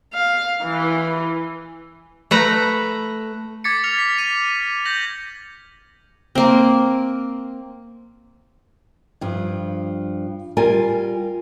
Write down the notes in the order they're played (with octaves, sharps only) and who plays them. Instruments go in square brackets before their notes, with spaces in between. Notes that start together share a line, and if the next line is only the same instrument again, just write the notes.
[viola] F5
E3
[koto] A3 B4 A#5
[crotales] D6 G#6 A6 B6 C#7
F6 A#6 F7
B6
D#7
G6 A#6 F#7
[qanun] A#3 C4
[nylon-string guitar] G2 F3
G3 F4 A#4 G#5